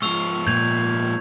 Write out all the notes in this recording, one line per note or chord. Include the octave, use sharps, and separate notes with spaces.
G#2 F3 C#6 E6 F7
A#2 G6 G#6 F7